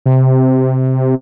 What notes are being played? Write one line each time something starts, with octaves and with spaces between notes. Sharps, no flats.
C3